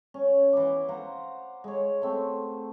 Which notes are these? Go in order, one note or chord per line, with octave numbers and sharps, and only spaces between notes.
C#4
E3 B3 D6
C5 F5 F#5 A#5
G#3 C#5
A3 C4